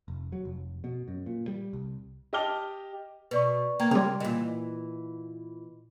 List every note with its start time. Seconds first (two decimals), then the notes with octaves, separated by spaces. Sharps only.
0.08 F1
0.32 F#3
0.45 F1
0.84 B2
1.08 F#2
1.26 A#2
1.48 G3
1.73 C2
2.33 G4 D#5 A5 D6 F6 G7
3.31 B2 B4 D5 C#6
3.80 A#3 G5 A#5 G#6
3.91 C#3 G3 A#4 G5 C6
4.20 A#2 E3 D#5